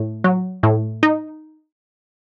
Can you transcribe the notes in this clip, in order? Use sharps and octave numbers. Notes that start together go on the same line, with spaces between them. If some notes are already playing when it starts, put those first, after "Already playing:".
Already playing: A2
F#3
A2
D#4